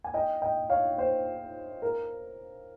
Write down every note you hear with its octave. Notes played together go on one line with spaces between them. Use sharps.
G#5
D#5 G5
D#5 G5
C#5 F5
C5
A#4